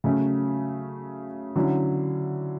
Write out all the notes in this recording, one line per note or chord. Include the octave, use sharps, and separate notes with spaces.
C#3 F#3 A3 C#4
D3 F#3 C#4 E4